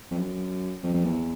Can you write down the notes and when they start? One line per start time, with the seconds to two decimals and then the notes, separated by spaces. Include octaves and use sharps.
0.11 F2
0.18 F#2
0.83 F2
0.94 F2
1.05 E2